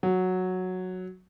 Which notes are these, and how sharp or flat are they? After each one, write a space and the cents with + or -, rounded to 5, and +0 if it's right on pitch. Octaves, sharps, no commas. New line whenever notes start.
F#3 -5